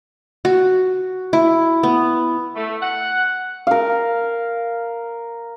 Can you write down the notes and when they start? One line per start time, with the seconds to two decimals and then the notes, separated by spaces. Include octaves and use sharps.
0.45 F#4
1.33 E4
1.83 B3
2.55 A3
2.82 F#5
3.67 A#4 F5